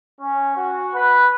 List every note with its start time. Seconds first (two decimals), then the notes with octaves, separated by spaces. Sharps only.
0.20 C#4
0.57 F#4
0.94 B4